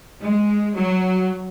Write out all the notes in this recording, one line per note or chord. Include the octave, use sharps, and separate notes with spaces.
G#3
F#3